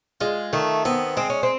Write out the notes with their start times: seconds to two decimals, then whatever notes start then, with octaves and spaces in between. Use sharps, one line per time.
0.21 G#3 F4
0.53 D#3 A3
0.85 B3 C4
1.17 G#3 C4
1.30 C#4
1.43 C4